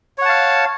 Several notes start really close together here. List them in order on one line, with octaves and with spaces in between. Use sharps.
C#5 F#5 A5 F5